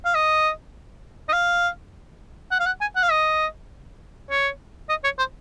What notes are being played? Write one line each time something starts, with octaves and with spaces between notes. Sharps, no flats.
F5
D#5
D#5
F5
F#5
F5
F#5
G#5
F#5
F5
D#5
C#5
D#5
C#5
C5